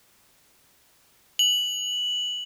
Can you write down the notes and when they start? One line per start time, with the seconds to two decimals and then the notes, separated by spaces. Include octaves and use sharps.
1.39 F#7